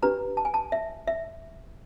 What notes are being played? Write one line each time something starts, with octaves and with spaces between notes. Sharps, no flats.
D4 G4 B4 A#5
A5
G#5
A5
E5
E5